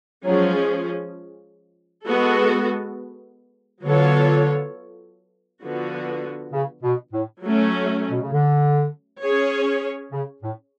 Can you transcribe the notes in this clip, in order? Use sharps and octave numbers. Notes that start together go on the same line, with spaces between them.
F3 F#3 G#3 C#4 G#4
G#3 B3 F#4 A4
D3 F#3 B3 F4 A4 C#5
D3 F3 B3 F#4
C#3
B2
A2
F#3 A3 C#4
B2
C#3
D3
C#4 G#4 C#5
C#3
A2